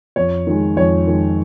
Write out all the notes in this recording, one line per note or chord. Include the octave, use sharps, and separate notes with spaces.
F2 C#5
D#3 G#3
F2 C#5
D#3 G#3